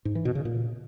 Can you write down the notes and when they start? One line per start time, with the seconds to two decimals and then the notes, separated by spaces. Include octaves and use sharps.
0.05 G#2
0.15 E3
0.25 B2
0.35 C#3
0.45 A#2